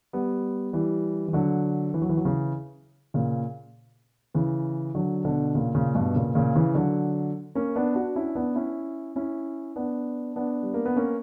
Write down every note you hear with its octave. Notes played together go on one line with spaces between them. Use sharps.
G3 B3
E3 G3
E3
D3 F#3
E3
F#3
E3
F#3
C#3 E3
A#2 C#3
C#3 E3
D3 F#3
B2 D3
A#2 C#3
A#2 C#3
G2 B2
A#2 C#3
A#2 C#3
C#3 E3
D3 F#3
A#3 C#4
B3 D4
D4 F#4
C#4 E4
B3 D4
C#4 E4
C#4 E4
B3 D4
B3 D4
G3
A#3
B3
A#3 C#4